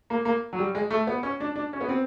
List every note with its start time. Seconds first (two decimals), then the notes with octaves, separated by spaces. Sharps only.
0.10 A#3
0.25 A#3
0.53 F#3
0.59 G3
0.75 G#3
0.90 A3
1.07 B3
1.23 C#4
1.40 D4
1.56 D4
1.73 C#4
1.81 B3
1.89 C4